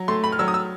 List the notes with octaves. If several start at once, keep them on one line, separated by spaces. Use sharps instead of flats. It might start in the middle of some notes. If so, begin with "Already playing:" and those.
Already playing: F#3
A3 C6
B5
F6
F#3 E6
D#6
E6